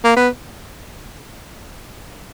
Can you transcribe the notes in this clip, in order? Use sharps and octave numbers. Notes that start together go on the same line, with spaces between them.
A#3
B3